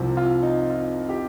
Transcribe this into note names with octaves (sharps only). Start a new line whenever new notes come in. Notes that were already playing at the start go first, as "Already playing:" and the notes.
Already playing: C2 C3 F3 C4
F4
D#4
F4
G4